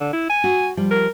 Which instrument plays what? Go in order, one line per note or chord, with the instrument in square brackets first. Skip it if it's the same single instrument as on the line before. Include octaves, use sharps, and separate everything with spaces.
[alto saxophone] D3
E4
G#5
[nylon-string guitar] F#4
F3 G3
[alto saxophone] A#4